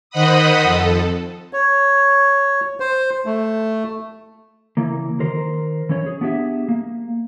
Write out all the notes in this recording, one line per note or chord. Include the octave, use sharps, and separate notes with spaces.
D#3 C5 D#5 F#5 B5 D#6
F2 A4
C#5
C5
A3
C#3 E3 A#3
D#3 A#4 C5
E3 C#4 C#5
G#4
B3 D4 G4 G#4 E5
A#3